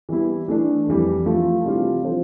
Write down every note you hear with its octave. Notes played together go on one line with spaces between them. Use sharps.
E3 G3 B3 E4
E3 A3 D4
F2 E3 G3
F3 A3 E4
C3 E3 G3 C4 F4
F3 C4 F4 A4 C5